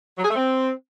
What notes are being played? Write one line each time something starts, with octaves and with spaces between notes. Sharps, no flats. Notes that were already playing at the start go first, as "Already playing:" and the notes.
F#3
G#4
A3
C4